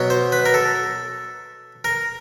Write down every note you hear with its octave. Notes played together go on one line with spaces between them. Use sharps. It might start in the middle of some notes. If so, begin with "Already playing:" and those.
Already playing: B2 F#3 B3
C5
B4
A#4
A4
A#4